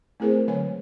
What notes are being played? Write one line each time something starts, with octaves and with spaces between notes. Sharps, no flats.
A3 C4 E4 G#4 A#4 C5
D3 F#3 G#3 B4 C#5 G#5